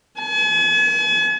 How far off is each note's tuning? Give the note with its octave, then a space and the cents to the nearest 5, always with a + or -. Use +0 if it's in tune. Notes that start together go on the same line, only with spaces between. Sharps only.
G#5 +45